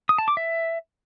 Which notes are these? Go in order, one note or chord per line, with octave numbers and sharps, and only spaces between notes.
D#6
A5
D6
E5